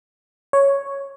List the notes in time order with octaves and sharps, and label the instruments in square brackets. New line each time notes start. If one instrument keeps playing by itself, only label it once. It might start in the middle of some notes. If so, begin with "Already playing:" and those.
[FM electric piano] C#5